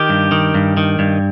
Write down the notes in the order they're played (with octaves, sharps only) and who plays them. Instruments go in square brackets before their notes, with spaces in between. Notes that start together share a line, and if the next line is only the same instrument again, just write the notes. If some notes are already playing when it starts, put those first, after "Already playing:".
Already playing: [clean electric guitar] D#3 G4
G2
D#3
G2
D#3
G2